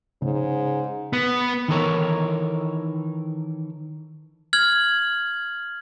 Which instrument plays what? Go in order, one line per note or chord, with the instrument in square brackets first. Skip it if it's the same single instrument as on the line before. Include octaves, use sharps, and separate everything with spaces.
[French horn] G#2 [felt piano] C#3
[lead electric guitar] B3
[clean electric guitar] D#3 E3 D#4 A4 A#4 C#5
[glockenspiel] F6 G#6 F#7